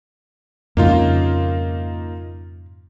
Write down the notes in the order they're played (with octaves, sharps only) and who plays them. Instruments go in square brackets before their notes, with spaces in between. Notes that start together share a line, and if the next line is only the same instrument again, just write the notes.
[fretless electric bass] F2 G#2 C#3 [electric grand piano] A#3 D#4 F4